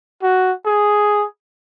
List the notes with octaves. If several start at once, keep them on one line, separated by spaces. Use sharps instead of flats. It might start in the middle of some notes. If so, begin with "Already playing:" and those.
F#4
G#4